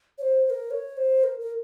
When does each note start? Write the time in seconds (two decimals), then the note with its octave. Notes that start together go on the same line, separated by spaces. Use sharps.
0.18 C#5
0.22 C5
0.45 C5
0.50 A#4
0.71 C#5
0.97 C5
1.24 A#4
1.40 A#4